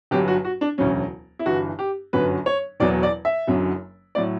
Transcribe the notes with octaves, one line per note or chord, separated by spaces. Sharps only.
G1 G2 F#3 G4
F#4
F#4
D4
E1 D2 C#3 F#3 C#4
E4
G1 G2 E3 F#4
G4
G1 F#2 D3 F#3 B4
C#5
E1 E2 B2 F#3 D5
D5
E5
F#1 F#2 D3 F#3
A2 F#3 D5